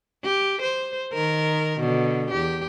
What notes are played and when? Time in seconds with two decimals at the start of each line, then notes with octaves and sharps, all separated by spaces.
0.24 G4
0.62 C5
1.13 D#3 A#4
1.80 B2 D3
2.31 E2 G4